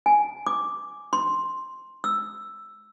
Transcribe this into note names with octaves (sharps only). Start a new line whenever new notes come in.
G#5
D6
C6
E6